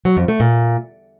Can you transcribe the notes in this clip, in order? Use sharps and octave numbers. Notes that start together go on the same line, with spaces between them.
F#3
F2
A3
A#2